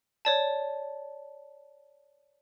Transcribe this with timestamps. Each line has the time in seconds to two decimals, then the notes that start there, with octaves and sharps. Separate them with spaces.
0.25 C#5 D5 A5